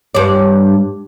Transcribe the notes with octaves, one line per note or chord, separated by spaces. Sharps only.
G2 D5